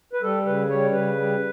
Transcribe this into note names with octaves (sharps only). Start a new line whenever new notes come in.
B4
G3 A4
C#3 B4
G3 C#5
C#3 B4
G3